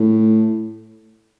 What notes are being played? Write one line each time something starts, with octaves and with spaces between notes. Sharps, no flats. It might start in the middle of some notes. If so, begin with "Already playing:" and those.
Already playing: A2